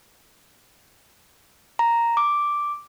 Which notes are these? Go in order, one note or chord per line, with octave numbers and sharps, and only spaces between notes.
A#5
D6